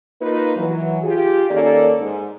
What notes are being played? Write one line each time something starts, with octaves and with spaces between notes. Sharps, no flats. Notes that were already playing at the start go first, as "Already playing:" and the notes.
A#3 D#4 F4 B4
E3 F#3
F4 G4 G#4
D#3 A#3 C#4 A4 D5
G#2